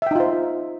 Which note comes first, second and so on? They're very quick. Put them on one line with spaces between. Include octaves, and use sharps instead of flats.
E5 G5 D#4 F4 C5